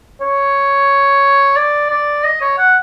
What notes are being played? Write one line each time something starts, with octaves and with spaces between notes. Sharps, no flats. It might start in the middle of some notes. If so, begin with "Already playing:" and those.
C#5
D5
D5
D#5
C#5
F#5